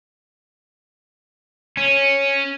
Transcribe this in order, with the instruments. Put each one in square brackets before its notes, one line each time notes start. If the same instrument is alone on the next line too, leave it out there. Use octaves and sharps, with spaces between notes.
[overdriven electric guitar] C#4